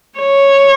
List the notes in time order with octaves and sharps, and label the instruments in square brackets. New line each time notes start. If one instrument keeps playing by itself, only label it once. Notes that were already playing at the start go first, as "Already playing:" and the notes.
[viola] C#5